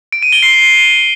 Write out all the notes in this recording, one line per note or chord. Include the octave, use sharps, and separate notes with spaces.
D7
D#7
G7
C7